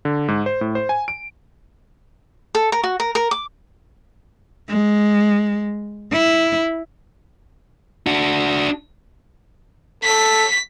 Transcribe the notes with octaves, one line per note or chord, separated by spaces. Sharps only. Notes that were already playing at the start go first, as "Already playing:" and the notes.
D3
G#2
C5
A2
C5
G#5
D7
A4
A#4
F#4
A#4
A#4
D6
G#3
E4
D4 F#4
A4 B6